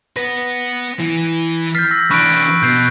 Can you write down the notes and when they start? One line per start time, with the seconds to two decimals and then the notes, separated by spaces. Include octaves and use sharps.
0.17 B3 B4 A#6
1.00 E3
1.75 F6 G6 A6 B6 C7
1.91 E6 A#6
2.11 E3 D4 B5 C#6 F#6 D7
2.63 B2 G6 C7